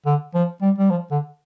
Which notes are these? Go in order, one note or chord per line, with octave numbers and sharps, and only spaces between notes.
D3
F3
G3
G3
F3
D3